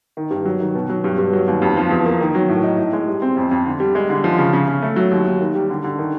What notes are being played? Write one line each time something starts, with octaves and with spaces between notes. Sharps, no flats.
D#3
G2
F#3
D#3
B2
F#3
G2
G2
F#3
D#2
F2
F3
E2
A#3
D#3
F#3
A2
D#4
A2
G#3
G3
C4
F2
F2
D3
G3
G#3
D3
F3
C#3
C#3
C#3
A3
F#3
D#2
D#2
D#3
G3
D3
D3
D#3